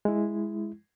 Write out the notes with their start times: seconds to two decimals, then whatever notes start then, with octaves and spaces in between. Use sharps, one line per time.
0.05 G#3 E4